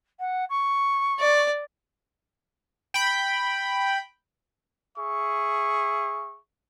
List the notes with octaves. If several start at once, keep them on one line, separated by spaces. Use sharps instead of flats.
F#5
C#6
D5
G5 B5
G#4 E5 C#6